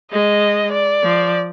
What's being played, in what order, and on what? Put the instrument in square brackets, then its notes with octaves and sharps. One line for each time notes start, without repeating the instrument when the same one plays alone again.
[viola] G#3 [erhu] D#5
[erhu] D5
[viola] F3